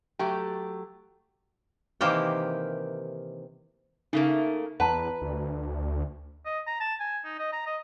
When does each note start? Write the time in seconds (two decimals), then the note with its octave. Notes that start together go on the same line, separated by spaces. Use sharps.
0.19 F#3 A3 G4
2.01 C3 D#3 E3 A#3 G4 G5
4.13 C#3 A3 A#3 D#4
4.80 E2 B4 F#5 A5 A#5
5.21 D2
6.46 D#5
6.67 A#5
6.80 A5
7.00 G#5
7.25 D#4
7.39 D#5
7.53 A#5
7.66 D#5